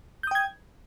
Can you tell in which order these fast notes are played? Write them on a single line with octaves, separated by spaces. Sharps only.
G6 D#6 G5 G#6